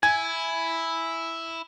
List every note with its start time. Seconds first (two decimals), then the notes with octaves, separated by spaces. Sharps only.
0.03 E4 G#5 G#6